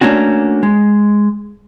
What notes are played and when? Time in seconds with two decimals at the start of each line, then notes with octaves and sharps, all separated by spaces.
0.01 A3 A#3 C#4 D4 F#4
0.63 G#3